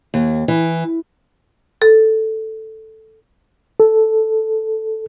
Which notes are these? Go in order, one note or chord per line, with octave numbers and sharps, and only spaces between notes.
D#2
E3
A4
A4